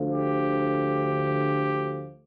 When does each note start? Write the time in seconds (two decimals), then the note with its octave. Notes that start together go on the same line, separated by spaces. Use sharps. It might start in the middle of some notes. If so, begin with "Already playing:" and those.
Already playing: D2 D3 F3
0.11 G4